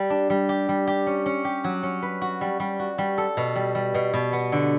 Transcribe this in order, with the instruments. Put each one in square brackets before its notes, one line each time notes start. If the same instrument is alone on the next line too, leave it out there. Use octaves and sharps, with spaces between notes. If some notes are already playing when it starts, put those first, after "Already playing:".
Already playing: [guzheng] G3
D4
G3
G4
G3
G4
C#4
C#4
G4
F#3
C#4
B4
F#4
G3
G3
F#4
G3
A4
B2
G3
G3
B2
B2
B3
D3